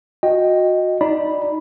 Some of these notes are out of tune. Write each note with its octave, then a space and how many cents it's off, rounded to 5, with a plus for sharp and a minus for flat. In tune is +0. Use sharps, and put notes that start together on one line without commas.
F#4 -25 D#5 +0 G5 +0
D#4 +0 D5 +0 B5 -10